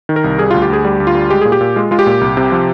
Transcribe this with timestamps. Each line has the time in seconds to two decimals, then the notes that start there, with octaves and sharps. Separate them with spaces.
0.09 D#3
0.16 A#4
0.24 C2
0.39 G3 G#4
0.51 D2 F4
0.62 G4
0.70 D2 G#4
0.85 G3 G4
1.00 D2
1.07 F4
1.15 G3
1.30 G#3 G4
1.41 A#2 G#4
1.52 G4
1.61 A#2
1.76 G#3 F4
1.91 G#3 F4
1.99 G4
2.06 A#2
2.21 C2
2.37 C3
2.52 F3